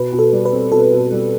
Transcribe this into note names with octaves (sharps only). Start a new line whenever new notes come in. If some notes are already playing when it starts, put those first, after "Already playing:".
Already playing: B2 B4
B2
A4
G3
B4
C4
B2 A4
B2
G3